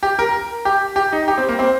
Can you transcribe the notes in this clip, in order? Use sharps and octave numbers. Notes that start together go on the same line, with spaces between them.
G4
A#4
G4
G4
D#4
G4
C4
A#3
C4